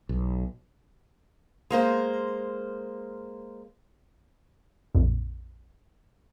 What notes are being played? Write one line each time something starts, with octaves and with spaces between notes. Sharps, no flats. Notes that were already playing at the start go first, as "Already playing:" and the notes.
B1
G#3 A#3 C5
A#1 F2